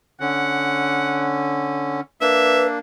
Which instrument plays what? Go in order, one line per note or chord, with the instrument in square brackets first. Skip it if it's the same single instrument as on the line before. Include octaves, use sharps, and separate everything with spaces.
[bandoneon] D3 C#4 [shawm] F#5
[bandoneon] A#3 D4 [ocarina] B4 [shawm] E5